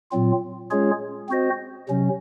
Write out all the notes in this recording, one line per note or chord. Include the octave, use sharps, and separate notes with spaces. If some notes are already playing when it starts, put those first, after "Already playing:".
A#2 F#3 C4 F4
G#3 C#4 F4 G#4 C#5
C4 F#4 C5 D#5
C3 F#3 C#4